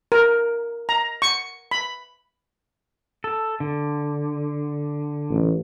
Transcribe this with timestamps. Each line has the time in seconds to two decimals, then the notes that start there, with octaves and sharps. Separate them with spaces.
0.12 A#4
0.89 A#5
1.22 C#6
1.71 B5
3.24 A4
3.60 D3
5.31 A1